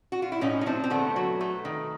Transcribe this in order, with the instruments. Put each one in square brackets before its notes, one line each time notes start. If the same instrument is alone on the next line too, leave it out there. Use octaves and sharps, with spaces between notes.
[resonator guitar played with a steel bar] F#4
F4
E4
A2 C#4 D#4
D#4
F3 C4 D4
C4
D3 A3 B3
F#3
A3
D#3